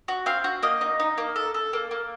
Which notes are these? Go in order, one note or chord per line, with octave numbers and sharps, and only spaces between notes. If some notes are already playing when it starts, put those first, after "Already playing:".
F#4
C4 F5
F#4
A#3 D#5
D#4
D#4
A#3
A4
A4
A#3
A#3